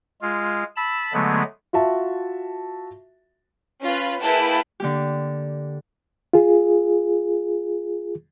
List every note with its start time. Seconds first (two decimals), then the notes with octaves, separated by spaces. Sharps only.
0.22 G#3 F4
0.76 A5 B5 E6
1.13 D3 F#3 G#3 A3 B3
1.73 F4 F#4 E5 A5
3.81 C#4 F4 B4
4.21 A#3 E4 G#4 B4 G5 A5
4.80 D3 A#3 G4
6.33 F4 G#4